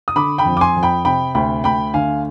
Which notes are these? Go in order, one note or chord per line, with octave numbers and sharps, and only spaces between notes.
D#6
D3 B5 D6
G5 B5
F2
D6
G#5 C6
F2
G5 B5
C3 G5 B5
D2 G5 B5
D2 G5 B5
D3 F5 G#5